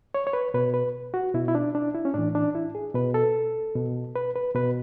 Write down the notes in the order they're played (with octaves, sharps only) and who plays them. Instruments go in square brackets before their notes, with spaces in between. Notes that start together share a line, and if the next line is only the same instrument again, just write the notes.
[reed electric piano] C#5
C#5
B4
B2 B4
B4
F#4
B2 E4
E4
D4
D4
E4
C#4
A2 E3 D4
D4
E4
G#4
B2 B4
A4
B2
B4
B4
B2 B4